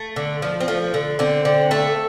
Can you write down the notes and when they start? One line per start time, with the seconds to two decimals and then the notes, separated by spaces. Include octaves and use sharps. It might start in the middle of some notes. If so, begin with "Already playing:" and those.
Already playing: A3
0.16 D3
0.42 F3
0.60 C4
0.68 F3 A3
0.94 D3
1.19 D3 C4
1.45 D3
1.71 A3 A4